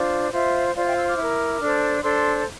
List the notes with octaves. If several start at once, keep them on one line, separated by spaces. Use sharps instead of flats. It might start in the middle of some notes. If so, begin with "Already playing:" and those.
Already playing: D4 F4 C5
F4 C5 E5
F4 C5 D5 F5
E5 G5
C6 E6
D6 F6
E4 A#4
D4 A4 C5
D4 A4 C5 C6 E6